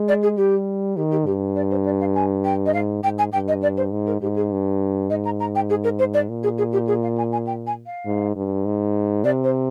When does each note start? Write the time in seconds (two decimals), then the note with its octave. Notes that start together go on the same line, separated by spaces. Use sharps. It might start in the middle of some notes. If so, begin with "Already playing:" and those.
Already playing: G#3
0.08 D5
0.23 G#4
0.37 G3 G4
0.96 D#3 G4
1.11 G4
1.26 G2 G4
1.56 D5
1.71 C5
1.85 D5
2.00 F5
2.15 G#5
2.45 G5
2.66 D#5
2.74 G#2 F5
3.03 G#2 G5
3.18 G#5
3.32 G2 G5
3.48 D#5
3.63 D5
3.77 C5
3.92 G#2
4.07 A#4
4.21 G#2 G4
4.36 G#4
4.52 G2
5.10 G#2 D#5
5.25 A#5
5.40 A#5
5.55 G5
5.70 G#4
5.84 A#4
5.99 C5
6.14 D5
6.29 A#2
6.43 G#4
6.58 G#4
6.73 G4
6.87 G#4
7.03 F5
7.18 G#5
7.32 G#5
7.47 G5
7.67 G#5
7.86 F5
8.06 G#2
8.36 G2
8.65 G#2
9.24 C3 D5
9.44 C5